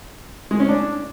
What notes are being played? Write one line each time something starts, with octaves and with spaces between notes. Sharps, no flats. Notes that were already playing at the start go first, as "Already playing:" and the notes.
G#3
C#4
D4